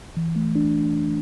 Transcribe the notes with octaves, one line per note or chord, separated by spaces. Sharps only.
E3
A3
D4